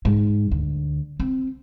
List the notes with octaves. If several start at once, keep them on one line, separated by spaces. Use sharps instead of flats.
G#2
D2
C4